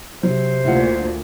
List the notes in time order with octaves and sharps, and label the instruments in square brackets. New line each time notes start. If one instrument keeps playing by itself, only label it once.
[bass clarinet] C3 [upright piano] F#3 [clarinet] C5
[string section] D2 A#2 [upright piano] E4 F4 F#5